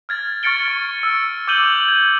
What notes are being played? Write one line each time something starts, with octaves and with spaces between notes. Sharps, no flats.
F6 G#6 A6
C#6 F6 A6 C#7 D7 G7
C#6
E6
D6 E6 G6 D#7 F#7 G7
G#6